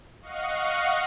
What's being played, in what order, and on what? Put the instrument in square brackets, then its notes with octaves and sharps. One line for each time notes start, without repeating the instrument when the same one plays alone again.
[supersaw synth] D#5 F5 F#5 C#6